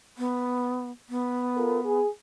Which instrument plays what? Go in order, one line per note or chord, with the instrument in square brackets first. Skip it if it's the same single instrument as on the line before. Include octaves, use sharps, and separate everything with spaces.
[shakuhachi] B3
B3
[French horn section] F4 A4 A#4
G#4